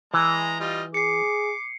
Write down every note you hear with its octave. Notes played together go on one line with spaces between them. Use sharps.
E3 G#3 A#5
G3 F4 D#5
G#4 D6 C7 C#7